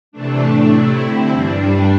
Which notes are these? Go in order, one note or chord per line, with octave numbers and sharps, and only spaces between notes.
C3 E3 A3 D4
A2 A3 D4
C3 A3 E4
D3 C4 E4
G2 E3 G3 D4